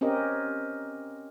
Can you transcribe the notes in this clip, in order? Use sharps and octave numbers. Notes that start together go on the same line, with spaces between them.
C4 C#4 G4 A#4 D#5